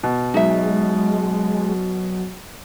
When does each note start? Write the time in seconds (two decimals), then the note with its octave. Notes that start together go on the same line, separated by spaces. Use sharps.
0.03 B2
0.34 F#3 G#3 D#4 E5